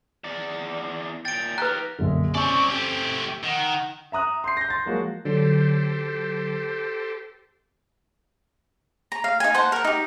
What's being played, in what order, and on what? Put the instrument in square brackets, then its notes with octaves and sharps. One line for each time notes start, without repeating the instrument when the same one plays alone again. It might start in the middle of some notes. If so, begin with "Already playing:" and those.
[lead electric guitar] E2 D5
[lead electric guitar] A#2 G5 [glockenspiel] A6 D7
[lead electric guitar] G4 A#4 [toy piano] B4 A#5 [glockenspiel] F#6
[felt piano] A#1 F#2 D3 [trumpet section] G#3 E5
[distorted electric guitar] C4 D5 [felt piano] C#4 G#5 [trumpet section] C#6
[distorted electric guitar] A3 G4 [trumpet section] C4
[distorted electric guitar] D#3 [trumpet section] F#5
[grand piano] E5 A#5 D#6 F#6
C6 G6 C7
G6 A#6
C6 A6
F3 F#3 G#3 A#3 F#4
[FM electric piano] D3 F#3 [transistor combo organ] G4 A4 C5
[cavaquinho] A#5
F5
D#4 G#5
C5 F#5 A5
A#4 F#5
D#4 G4